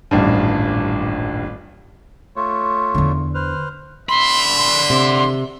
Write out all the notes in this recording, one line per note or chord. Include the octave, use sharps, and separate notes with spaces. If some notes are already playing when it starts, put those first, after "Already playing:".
D#1 A1 G2
A3 F4 C#5
E2 D3
B4 C5 F6
D3 E5 B5 C6
C6
C3